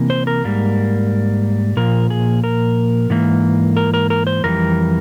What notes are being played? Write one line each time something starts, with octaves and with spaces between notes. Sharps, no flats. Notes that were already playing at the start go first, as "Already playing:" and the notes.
Already playing: C3 E3 A#3
C5
A#4
G#2 G3 A#3
A#2 F3 A#3 A#4
G#4
A#4
G#2 E3 A#3
A#4
A#4
A#4
C5
F2 E3 G3 A#4